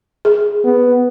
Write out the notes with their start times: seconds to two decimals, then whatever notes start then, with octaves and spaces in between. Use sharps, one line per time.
0.25 G#4
0.64 B3